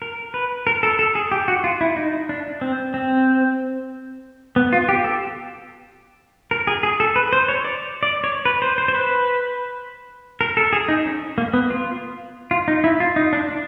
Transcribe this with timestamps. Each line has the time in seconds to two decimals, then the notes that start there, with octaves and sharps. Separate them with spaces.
0.02 A#4
0.34 B4
0.67 A#4
0.83 A4
0.99 A4
1.15 G#4
1.32 G4
1.48 F#4
1.64 F4
1.81 E4
1.96 D#4
2.29 D4
2.61 C4
2.94 C4
4.56 B3
4.73 F4
4.89 G4
5.04 A4
6.51 A#4
6.67 G#4
6.83 G#4
7.00 A4
7.16 B4
7.33 C5
7.48 C#5
7.65 D5
8.03 D5
8.24 C#5
8.45 B4
8.62 C5
8.78 C5
8.88 C5
8.95 B4
10.41 A#4
10.57 A4
10.73 G#4
10.88 D#4
11.05 C#4
11.38 A#3
11.53 B3
11.70 F4
12.51 F4
12.68 D#4
12.84 E4
13.00 F4
13.16 D#4
13.33 D4
13.49 D4